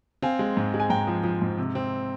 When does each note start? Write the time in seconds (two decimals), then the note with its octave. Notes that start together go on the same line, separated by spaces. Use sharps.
0.22 C4 F5 G#5
0.39 G#3
0.57 G#2
0.74 G#3
0.80 G#5
0.90 G#2 G5 A#5
1.07 F3
1.24 F3
1.42 G#2
1.58 C3
1.75 C4